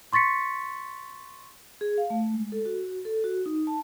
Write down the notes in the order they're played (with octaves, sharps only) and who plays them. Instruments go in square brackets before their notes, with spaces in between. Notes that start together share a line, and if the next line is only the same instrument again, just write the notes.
[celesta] C6 C#6 A6 B6 C#7
[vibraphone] G#4
F5
A3
G#3
A4
F#4
A4
F#4
D#4
A5